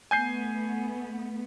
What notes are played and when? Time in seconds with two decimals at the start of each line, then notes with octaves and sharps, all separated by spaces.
0.11 A3 B3 G#5 G6 C7